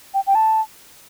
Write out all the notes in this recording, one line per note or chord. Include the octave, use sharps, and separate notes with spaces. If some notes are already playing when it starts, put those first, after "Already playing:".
G5
G5
A5